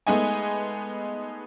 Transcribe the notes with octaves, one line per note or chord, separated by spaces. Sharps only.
G#3 A3 B3 D#4 D#5 G#5